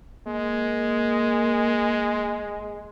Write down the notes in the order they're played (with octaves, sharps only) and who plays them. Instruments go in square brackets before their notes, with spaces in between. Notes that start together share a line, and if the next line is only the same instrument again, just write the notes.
[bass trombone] G#3 [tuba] A#3